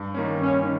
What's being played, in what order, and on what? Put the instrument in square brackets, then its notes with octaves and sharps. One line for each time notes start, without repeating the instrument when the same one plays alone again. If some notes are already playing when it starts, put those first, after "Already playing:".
Already playing: [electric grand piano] G2
D#3 A#3 C#4
[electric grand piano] G2 [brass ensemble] C#4
[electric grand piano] D#3